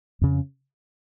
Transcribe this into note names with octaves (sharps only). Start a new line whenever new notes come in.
F2 C#3